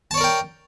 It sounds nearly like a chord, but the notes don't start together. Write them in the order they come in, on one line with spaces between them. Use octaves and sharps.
A5 C#5 D5 A#4 G5